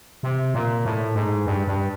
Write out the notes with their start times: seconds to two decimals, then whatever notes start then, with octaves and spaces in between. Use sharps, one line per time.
0.23 C3
0.54 A#2
0.85 A2
1.15 G#2
1.46 G2
1.67 G2